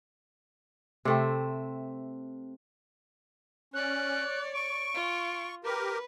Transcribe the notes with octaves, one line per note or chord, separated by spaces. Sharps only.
C3 A3 C4
C#4 C#5 D5 F#6
C#6 D7
F4
G4 A#4 B4